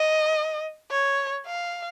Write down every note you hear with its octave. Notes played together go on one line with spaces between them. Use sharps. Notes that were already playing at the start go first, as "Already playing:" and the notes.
Already playing: D#5
C#5
F5